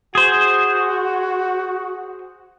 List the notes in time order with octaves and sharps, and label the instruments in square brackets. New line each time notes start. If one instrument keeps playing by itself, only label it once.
[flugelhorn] F#4 [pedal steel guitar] G#4 C5